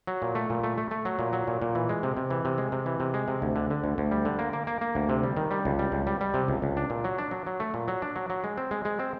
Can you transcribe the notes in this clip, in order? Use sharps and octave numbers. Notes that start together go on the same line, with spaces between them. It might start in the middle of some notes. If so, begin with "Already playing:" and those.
F#3
A#2
A3
A#2
A3
A3
A3
F#3
A#2
F#3
A#2
A#2
E3
G#3
C3
C3
E3
C3
G#3
C3
E3
C3
G#3
C3
D2
D3
D3
D2
D2
G3
D3
A#3
A#3
A#3
A#3
D2
C3
G3
D#3
G3
C#2
G3
C#2
G3
G3
C3
C#2
C#2
D4
A#2
F#3
D4
F#3
F#3
A3
A#2
F#3
D4
F#3
F#3
G#3
C4
G#3
G#3
C4